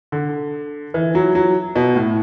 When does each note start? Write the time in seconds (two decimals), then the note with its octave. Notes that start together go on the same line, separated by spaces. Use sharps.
0.12 D3
0.94 E3
1.15 F#3
1.35 F#3
1.76 B2
1.96 A2